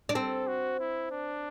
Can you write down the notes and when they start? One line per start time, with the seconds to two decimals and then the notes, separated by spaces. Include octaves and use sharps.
0.09 D4
0.15 C4 A4
0.48 F#4
0.80 E4
1.11 D4